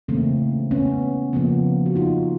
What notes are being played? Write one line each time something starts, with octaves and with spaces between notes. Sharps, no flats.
C#3 E3 A3 A#3 C4
B3 C#4
C#3 F3 A#3 B3
F#4
D#4 F4